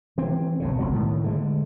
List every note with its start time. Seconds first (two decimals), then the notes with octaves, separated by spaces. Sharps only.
0.18 E3 C4
0.60 B1 A2 C#3
0.79 E1 C#2 F#3
0.92 A2 D#3
1.24 D3 F#3 G#3